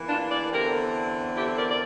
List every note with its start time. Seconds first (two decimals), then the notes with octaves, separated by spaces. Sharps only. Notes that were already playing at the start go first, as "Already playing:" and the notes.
Already playing: E2 E3 A#3
0.08 D4 F4
0.30 A#4 D5
0.51 E2 D3 A3 C4 G4 A#4
1.36 E4 G4
1.57 A#4 D5
1.70 D5